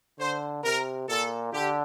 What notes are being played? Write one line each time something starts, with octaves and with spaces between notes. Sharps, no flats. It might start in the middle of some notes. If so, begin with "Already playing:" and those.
D3 C5
C3 A#4
A#2 A4
D3 G4